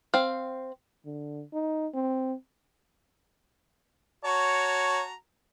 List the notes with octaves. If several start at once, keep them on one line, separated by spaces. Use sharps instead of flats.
C4 F5
D3
D#4
C4
F#4 C#5 A5 A#5